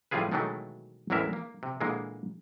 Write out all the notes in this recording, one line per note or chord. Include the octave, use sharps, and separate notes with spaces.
A2 F3 G3 F4 G#4 B4
B2 D#3 E3 F#3 G#3 A3
A1 E2 E3 G#3 A#4 E5
A#3
C3
A#2 D3 E3 G#3 A#3